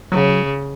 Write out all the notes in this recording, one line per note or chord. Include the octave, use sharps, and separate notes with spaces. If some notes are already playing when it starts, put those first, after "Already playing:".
C#3 F#3